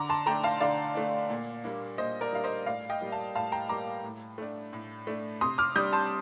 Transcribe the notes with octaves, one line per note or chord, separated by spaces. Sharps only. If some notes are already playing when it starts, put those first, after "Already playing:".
Already playing: D3 A#5 D6
A5 C6
A3 D4 G5 A#5
F5 A5
D3 D5 F5
A3 D4
A#2
G3 A#3 D4
A#2 C5 D#5
A#4 D5
G3 A#3 D4 F5
C5 D#5
A2 D5 F5
D#5 G5
G3 A#3
F5 A5
A2 F5 A5
G5 A#5
G3 A#3 A#5 D6
A2
A3 D4
A2
A3 D4
C3 C6 D#6
D6 F6
G3 D4 D#6 G6
A5 C6